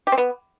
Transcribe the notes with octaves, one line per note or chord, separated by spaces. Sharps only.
G4
C4
B3